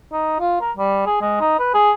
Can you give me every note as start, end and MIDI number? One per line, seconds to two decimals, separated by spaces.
0.13 0.38 63
0.40 0.59 65
0.61 0.72 70
0.77 1.02 55
1.06 1.17 68
1.22 1.39 56
1.41 1.58 63
1.59 1.70 71
1.74 1.92 68